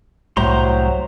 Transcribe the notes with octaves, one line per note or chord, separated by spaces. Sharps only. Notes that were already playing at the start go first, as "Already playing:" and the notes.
C2 A2 F#3 C5 A#5 C6